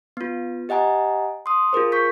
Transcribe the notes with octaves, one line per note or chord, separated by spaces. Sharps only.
B3 F4
G4 D#5 F#5 G#5 A#5
C6 D#6
F4 G#4 A#4 C5
C#6 G6 B6